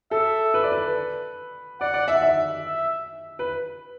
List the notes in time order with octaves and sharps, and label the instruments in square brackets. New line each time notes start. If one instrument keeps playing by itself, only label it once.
[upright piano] A4 [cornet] E5
[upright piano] B4
D5
B4
[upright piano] D5 [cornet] F#5
[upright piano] D5
E5
E5
[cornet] E5
[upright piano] B4